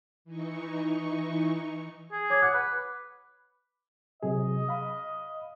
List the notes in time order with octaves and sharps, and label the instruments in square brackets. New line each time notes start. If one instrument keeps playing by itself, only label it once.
[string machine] E3 D#4 C#6
[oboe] G#4
[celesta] C#5 D6 G#6
[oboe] F#5 [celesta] D6
[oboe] B4
[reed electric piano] C3 F#3 G#4 [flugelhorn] D#5
[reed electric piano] F5 B5